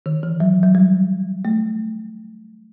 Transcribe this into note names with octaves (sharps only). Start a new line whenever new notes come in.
D#3
E3
F#3
F#3
G3
A3